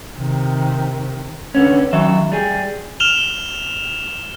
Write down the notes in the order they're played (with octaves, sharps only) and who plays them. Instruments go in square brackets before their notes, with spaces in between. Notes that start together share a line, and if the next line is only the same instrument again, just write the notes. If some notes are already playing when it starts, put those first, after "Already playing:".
[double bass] C3 D#3
[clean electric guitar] D3 B3 C#4
D#3 F#3 E5
G3 G#4
[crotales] F6 E7 F7 G7